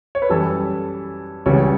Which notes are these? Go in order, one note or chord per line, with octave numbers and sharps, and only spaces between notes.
C#5
B4
F#2 E3 G3 A4
C#2 C#3 E3 G3 C#5